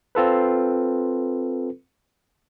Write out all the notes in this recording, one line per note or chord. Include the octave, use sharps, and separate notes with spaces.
C4 F4 A4 B4